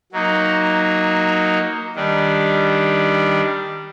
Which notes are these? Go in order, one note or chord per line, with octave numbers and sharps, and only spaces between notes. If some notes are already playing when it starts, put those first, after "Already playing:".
F#3 A#3 D#4
D#3 G3 D4